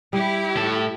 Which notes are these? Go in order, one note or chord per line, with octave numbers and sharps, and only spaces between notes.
G3 E4 G4
A2 A4